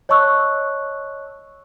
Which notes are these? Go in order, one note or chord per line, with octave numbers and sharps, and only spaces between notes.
C#5 D#5 A5 C#6 E6 F#6